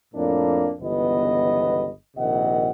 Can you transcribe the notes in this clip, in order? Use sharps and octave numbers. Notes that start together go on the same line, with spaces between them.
F2 A2 A#3 D4
G1 C#2 E3 B3 D#5
A#1 C3 D#3 D#5 F#5